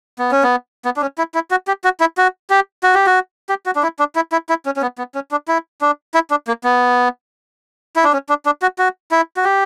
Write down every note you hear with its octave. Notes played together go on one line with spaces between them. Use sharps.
B3
C#4
B3
B3
D4
C#4
E4
E4
F#4
G4
F#4
E4
F#4
G4
F#4
G4
F#4
G4
F#4
D4
E4
D4
E4
E4
E4
C#4
C#4
B3
B3
C#4
D4
E4
D4
E4
D4
A#3
B3
E4
D4
C#4
D4
D4
F#4
F#4
E4
F#4
G4